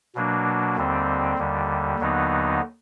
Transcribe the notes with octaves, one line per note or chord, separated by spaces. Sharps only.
B2 F#3 A#3 D4
D#2 D3 G3 C4
D#2 D3 G3
D#2 D3 F#3 B3 D#4